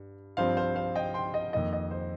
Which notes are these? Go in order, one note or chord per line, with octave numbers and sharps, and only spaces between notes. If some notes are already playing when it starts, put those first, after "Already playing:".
Already playing: G2
G2 F3 C4 C5 F5
C5 F5
C5 F5
D#5 G5
G5 C6
D#5
F2 D#3 A#3 D#5
D#5
C5